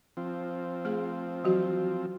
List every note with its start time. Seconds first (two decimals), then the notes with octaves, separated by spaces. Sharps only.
0.17 F3 C4
0.85 A3 G#4
1.44 E3 F#3 F#4